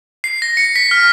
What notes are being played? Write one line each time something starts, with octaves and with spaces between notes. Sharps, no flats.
C7
A#6
C#7
B6
F6